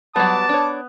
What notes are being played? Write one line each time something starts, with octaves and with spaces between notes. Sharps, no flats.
F#3 G3 B3 A5 D6
D4 C#5